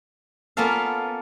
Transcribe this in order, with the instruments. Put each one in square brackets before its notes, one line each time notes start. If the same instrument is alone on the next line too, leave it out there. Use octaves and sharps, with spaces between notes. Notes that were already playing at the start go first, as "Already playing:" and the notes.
[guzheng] A#3 B3 C#4 F4 A4 F5